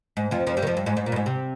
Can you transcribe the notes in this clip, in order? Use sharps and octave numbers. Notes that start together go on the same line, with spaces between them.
G#2
F2 F3
F2 F3
G2 G3
D#3
F2 F3
G2
G#2
G#2
A#2
G2
G#2
C3